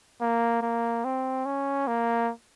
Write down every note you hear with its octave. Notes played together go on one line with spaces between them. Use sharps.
A#3
A#3
C4
C#4
A#3